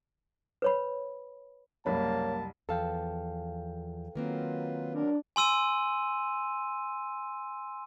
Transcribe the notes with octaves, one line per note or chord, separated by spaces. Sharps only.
B4 C#5 B5
F#1 C2 A#3 C#5 A5 B5
E2 F3 A4 F5 G5 A5
D#3 F#3 A#3 C4 F4 B4
F#3 D4 A#4
G#5 C6 E6 D#7